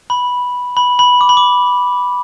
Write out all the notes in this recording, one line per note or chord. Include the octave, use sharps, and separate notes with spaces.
B5
B5
B5
D6
B5
D6